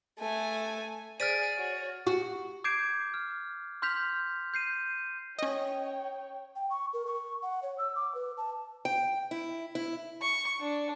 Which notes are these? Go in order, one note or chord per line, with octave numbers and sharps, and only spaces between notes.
A3 G#5
G#4 C5 D5 F6 A6 B6 D7 D#7
F#4 C#5
F#4
D6 G6 G#6 C7 D7 E7
F6
C6 F6 G6 B6 F7
G6 C7 D#7
C#4 C#5 D#5 G5
G5
C#6
A#4
C#6
F#5
C#5
E6
D6
B4
A5
G5
E4
E4
C#6
D4